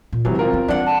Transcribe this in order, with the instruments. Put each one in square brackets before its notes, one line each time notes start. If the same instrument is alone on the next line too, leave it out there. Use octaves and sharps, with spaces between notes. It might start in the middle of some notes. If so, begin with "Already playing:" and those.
[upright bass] A#2
[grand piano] C3 E3 F#3 [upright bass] D#3 G#3
[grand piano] C4 F4 A#4
[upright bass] F3 B3
[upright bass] E3 G3 [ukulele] D4 F#5
[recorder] A5